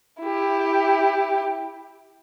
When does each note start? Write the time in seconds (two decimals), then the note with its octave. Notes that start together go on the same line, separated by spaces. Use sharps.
0.21 E4 G4